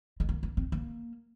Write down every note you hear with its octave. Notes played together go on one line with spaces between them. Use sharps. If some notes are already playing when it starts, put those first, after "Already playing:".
G#3
A#3
A#3
C4
A#3